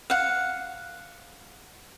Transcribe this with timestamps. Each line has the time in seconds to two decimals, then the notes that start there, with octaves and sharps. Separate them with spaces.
0.10 F5 F#5